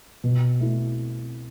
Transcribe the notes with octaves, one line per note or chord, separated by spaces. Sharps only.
B2
A3 E4